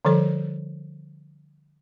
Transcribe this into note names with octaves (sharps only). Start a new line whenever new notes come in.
D3 F3 G3 A4 C5